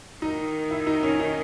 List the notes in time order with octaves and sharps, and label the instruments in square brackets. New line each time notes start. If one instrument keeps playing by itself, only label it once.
[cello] D#3 [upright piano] D#4
[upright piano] E4
D#4
C#4
D#4